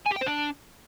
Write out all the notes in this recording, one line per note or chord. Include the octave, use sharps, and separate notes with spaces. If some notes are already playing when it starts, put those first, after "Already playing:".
G#5
G4
G5
C5
D4